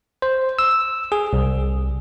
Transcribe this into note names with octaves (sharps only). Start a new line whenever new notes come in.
C5
E6
G#4
C2